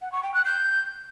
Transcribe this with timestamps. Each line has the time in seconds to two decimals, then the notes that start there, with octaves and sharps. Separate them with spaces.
0.01 F#5
0.12 C#6
0.23 G5
0.33 F#6
0.44 G6